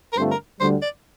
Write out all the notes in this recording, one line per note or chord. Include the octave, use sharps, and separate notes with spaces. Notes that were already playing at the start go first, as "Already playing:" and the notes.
A#4
G2 D3 A3 C4 F4 C5
A#4
D2 D3 G3 C5
D5